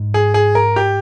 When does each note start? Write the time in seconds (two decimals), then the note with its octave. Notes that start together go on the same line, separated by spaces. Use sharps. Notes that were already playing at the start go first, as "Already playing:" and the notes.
Already playing: G#2
0.14 G#4
0.34 G#4
0.55 A#4
0.76 G4